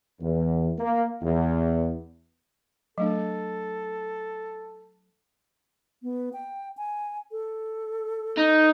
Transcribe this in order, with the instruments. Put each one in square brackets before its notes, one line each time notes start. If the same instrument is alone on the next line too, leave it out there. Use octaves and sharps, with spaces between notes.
[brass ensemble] E2
A#3
E2
[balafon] F#3 A3 D4 [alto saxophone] A4
[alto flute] B3
G5
G#5
A4
[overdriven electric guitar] D#4